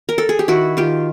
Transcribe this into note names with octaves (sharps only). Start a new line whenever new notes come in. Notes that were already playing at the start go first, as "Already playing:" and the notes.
A#4
A4
G#4
G4
D#3 E4 F#4
D#3 F4 G4